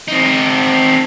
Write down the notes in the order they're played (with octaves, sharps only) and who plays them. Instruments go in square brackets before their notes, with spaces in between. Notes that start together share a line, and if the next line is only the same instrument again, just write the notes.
[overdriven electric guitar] C4 D#4